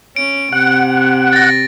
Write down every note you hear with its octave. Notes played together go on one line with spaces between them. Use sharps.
C#4 D7
C3 F#5
A6 A#6